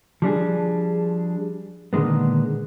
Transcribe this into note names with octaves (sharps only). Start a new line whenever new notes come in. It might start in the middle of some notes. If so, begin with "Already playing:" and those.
F3 G3 D4 G#4
A#2 D3 D#3 G#3 B3